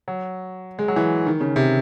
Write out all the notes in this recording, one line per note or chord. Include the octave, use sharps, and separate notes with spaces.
F#3
G#3
F#3
E3
D#3
C#3
C3